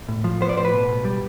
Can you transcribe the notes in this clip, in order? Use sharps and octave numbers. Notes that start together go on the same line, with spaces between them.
A2
F3
B3 C5
D5
A2 C5
B4
B2
B2
G3